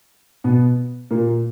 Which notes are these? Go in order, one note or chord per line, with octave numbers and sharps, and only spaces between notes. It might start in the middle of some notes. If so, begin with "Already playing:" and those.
B2 B3
A#2 A#3